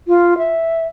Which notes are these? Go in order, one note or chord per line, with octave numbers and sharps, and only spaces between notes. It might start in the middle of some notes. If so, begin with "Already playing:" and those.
F4
E5